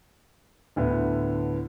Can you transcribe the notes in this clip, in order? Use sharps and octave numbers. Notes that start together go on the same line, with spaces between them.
D2 A2 D3 B3